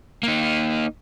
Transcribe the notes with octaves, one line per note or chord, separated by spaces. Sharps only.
A#3 D#4